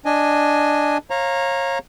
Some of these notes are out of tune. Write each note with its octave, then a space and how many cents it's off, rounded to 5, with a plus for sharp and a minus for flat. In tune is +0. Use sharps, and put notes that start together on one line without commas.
D4 +0 D#5 -10 G#5 +0
C#5 -30 F5 +0 A#5 +0